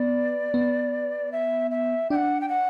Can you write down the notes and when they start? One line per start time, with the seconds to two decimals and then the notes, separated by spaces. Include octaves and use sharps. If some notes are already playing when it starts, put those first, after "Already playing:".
Already playing: B3 D5
0.54 B3
1.32 E5
1.71 E5
2.10 D4 F#5 G5
2.41 G5
2.49 F#5